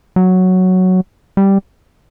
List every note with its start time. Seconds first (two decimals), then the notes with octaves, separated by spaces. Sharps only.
0.16 F#3
1.37 G3